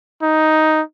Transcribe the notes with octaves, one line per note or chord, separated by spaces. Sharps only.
D#4